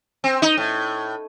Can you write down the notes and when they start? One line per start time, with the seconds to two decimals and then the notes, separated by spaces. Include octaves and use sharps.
0.24 C4
0.42 D#4
0.57 A2